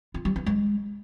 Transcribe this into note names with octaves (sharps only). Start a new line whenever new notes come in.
F4
G3
E4
G#3